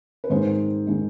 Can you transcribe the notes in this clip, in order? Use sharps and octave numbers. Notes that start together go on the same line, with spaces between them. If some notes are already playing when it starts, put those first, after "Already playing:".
B4
G#2 D#3 G#3 C5
D#3 G#3